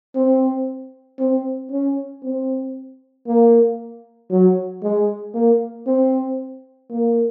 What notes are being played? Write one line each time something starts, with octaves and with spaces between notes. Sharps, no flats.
C4
C4
C#4
C4
A#3
F#3
G#3
A#3
C4
A#3